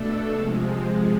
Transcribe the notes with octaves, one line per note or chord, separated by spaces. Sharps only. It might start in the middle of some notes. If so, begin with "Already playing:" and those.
Already playing: B2 A3 D4 A4
C3 F3 G#3